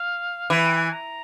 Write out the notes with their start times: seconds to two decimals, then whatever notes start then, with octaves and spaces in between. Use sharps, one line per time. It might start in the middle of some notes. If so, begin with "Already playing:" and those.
Already playing: F5
0.50 E3 F#5
0.64 G5
0.78 G#5
0.92 A#5